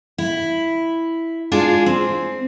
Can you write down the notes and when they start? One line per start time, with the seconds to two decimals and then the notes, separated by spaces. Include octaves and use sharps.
0.18 E4
1.51 G#3 D4 F4 G#4
1.86 C4